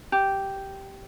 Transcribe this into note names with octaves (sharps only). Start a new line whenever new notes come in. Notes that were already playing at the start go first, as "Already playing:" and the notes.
G4